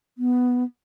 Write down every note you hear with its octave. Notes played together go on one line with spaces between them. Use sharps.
B3